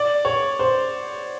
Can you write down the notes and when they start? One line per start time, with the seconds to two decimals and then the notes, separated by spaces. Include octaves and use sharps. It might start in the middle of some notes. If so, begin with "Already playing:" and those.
Already playing: D5
0.25 C#5
0.59 C5